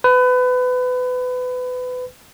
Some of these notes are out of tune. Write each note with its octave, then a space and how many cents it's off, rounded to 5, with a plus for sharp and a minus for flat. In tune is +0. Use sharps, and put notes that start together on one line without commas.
B4 +25